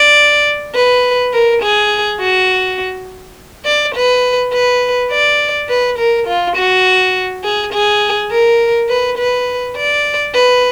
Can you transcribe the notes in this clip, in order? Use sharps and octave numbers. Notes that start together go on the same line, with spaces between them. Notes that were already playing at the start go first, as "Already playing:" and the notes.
Already playing: D5
B4
A#4
G#4
F#4
D5
B4
B4
D5
B4
A#4
F4
F#4
G#4
G#4
A#4
B4
B4
D5
B4